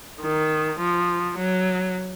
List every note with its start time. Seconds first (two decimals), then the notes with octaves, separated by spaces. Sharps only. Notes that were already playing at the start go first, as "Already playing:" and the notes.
0.20 D#3
0.80 F3
1.39 F#3